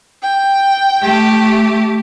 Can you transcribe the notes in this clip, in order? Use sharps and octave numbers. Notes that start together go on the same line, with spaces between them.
G5
A3 G4